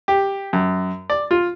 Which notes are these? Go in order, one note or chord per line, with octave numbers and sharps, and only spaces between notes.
G4
F#2
D5
F4